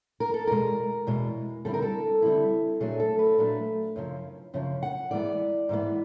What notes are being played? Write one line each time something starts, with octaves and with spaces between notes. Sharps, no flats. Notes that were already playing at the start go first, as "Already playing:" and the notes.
A#4
A4
E2 B2 G#3 A#4
E2 B2 G#3
D3 G3 C4 E4 A4
A#4
A4
D3 G3 C4 E4
A#2 F#3 A3 D4 G#4
A4
B4
A#2 F#3 A3 D4
F#2 C#3 F3
F#2 C#3 F3
F#5
G#2 E3 G#3 B3 D5
G#2 E3 G#3 B3